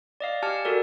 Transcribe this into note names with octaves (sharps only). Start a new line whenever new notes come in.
D5 D#5 F5
G4 G#5 A5 F6
F#4 A4 A#4 D5